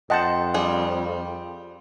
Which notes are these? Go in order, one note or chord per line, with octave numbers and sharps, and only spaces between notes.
F2 D#5 F#5 G5 A5 C6 G6
G3 G#4